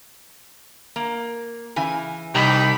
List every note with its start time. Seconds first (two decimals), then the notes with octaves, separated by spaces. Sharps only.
0.96 A#3
1.76 C#3 E3 G#5
2.35 C2 D#4 G4 B5